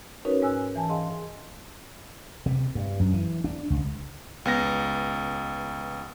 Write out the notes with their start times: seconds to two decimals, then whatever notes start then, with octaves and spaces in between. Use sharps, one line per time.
0.25 C#4 D#4 F#4 A#4 B4 C#5
0.42 G#2 G#5 E6 F#6
0.75 E3 G#5 A5
0.89 G#4 D#5 F5 C6
2.46 C3
2.75 G2
3.00 F#2
3.14 E3
3.44 D4
3.70 C#2
4.45 C#2 B3 A#6